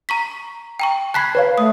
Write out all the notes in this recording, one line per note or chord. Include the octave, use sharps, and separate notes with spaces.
A#5 C#6 B6
G5 A#5 C#6
A5 B5 F#6 G#6 B6 C7
B4 C#5 F5
A3 D#6